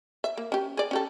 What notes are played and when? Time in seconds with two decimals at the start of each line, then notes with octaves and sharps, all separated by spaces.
0.24 E5
0.37 A#3
0.52 C#4 G4
0.77 G#4 D5
0.91 C#4 G4 A4